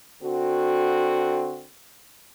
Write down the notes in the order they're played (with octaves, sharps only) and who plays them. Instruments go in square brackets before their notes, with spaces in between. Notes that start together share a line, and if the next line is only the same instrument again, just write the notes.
[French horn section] D3 C4 F#4